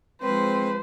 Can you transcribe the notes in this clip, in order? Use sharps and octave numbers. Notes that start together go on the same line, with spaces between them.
F3 G#3 C4 B4 C5